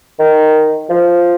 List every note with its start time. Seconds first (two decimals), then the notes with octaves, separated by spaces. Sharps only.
0.20 D#3
0.90 F3